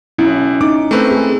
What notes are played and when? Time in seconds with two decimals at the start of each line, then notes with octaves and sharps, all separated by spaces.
0.19 B1 C#4 E4
0.61 D#4 D6
0.91 A3 C4 B4
1.11 G#4